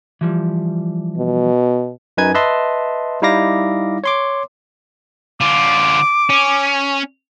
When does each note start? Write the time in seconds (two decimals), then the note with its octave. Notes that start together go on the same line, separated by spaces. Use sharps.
0.21 E3 F3 G3
1.17 B2
2.17 F#2 D#4 B4 G#5 G#6
2.34 B4 D#5 E5 A5 C6
3.22 G3 D#4 E4 F5 D6 A#6
4.04 C#5 C6 D6
5.41 D3 F4 D6
6.30 C#4